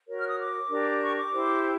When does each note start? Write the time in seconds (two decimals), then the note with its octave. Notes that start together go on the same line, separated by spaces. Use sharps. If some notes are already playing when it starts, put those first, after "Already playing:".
0.08 F#4 A#4 C#5
0.19 F6
0.29 D#6
0.39 D6
0.71 D4 G4 A#4
1.02 C#6
1.17 D6
1.32 E4 G4 C5